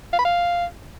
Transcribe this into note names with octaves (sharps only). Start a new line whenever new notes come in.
F5
B5
F5